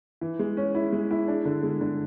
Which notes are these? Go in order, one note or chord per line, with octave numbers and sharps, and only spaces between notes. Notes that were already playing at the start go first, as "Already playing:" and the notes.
E3
G#3
C#4
E4
G#3
E4
D4
D3
G#3
D3